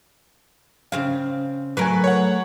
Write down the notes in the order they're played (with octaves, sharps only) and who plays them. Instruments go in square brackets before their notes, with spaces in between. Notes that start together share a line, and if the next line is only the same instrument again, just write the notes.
[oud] C#3 C4 F5
[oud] F#3 A3 A#4 [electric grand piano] B4 G#5
[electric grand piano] C#5 F#5